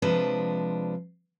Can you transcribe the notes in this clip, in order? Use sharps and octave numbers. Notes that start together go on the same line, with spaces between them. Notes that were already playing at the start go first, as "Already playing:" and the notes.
C3 F3 G#3 D4 B4 C5